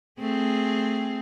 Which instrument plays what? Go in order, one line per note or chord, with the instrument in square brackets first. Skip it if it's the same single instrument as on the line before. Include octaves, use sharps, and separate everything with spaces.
[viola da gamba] A3 C4 G#4